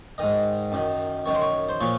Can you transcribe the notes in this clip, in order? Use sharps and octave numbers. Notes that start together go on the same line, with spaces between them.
G#2 D#3 D#5
F#2 D#3
F#2 D#3 C#5
C5
C#5
C5
A#2 F3 C#5